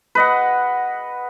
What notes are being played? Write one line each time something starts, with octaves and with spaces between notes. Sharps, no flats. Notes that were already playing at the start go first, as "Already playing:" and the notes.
B4 D#5 F#5